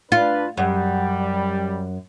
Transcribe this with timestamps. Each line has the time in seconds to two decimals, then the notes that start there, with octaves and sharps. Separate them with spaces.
0.12 D4 F4 B4
0.57 F#2 G3